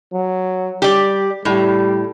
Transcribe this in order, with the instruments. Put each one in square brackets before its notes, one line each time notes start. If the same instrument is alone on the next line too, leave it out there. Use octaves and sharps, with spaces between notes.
[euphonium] F#3
[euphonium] G3 [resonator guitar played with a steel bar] G4 D5
[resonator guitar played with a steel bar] A2 [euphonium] G3